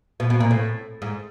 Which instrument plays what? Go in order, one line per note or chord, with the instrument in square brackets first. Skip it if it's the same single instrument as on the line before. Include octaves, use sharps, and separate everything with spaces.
[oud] B2
B2
A#2
A2
G#2